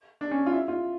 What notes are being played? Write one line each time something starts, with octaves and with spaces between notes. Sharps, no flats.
D4
C#4
F4
E4
F4